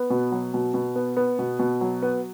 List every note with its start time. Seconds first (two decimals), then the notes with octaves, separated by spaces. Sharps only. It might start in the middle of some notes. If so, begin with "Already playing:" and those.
Already playing: B3
0.10 B2
0.32 F#3
0.54 B2
0.74 B2
0.96 B3
1.17 B3
1.39 B2
1.59 B2
1.81 F#3
2.02 B3